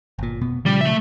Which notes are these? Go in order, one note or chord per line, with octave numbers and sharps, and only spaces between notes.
G1 A#2
F1 B2 B3
A#2 C#3 F3 G3
A3 E5